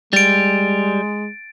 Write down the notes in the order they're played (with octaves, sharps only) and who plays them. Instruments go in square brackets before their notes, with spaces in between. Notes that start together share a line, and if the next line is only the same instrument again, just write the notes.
[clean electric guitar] G3 [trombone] G#3 [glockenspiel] A6 D7